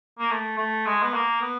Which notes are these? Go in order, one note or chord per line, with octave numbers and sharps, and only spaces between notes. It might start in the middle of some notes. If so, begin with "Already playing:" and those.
A#3
A3
A3
G#3
B3
A#3
B3